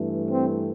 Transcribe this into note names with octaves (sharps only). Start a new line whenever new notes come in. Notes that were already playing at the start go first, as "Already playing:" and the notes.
Already playing: G2 E3 A3
C4